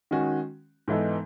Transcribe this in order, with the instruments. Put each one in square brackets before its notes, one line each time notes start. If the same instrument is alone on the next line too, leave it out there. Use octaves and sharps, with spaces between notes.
[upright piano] D#3 G#3 C#4 F#4
G#2 E3 B3 D#4 A4